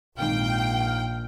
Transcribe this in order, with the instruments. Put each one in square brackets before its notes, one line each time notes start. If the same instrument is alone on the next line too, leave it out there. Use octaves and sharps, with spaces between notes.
[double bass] A#1 [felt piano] G#2 D#3 C4 [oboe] F5 [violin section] G5